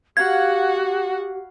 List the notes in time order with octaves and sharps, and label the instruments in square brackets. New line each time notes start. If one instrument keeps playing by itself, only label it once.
[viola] F#4 F#5 [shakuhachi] G4 [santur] F5 B5 [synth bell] G#6